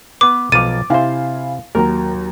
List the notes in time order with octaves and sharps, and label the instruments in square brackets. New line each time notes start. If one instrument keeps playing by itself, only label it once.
[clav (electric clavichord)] B3 B4 [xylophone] D6
[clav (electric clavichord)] B1 F3 F5 [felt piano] D6 A6 [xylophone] D#7
[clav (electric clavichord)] C3 C5 [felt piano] E4 F5 G#5
[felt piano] D#2 F#3 A#5 [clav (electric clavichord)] A#4